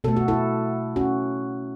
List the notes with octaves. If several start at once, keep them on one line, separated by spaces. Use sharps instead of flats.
B2 A3 A4
F#4
E4 A4
C#4 F#4